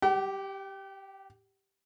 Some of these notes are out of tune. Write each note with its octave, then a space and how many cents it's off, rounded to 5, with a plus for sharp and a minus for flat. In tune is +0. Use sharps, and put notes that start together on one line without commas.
G4 -5 G5 -45